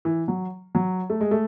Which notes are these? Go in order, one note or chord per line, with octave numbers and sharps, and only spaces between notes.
E3
F#3
F#3
A3
G#3
A3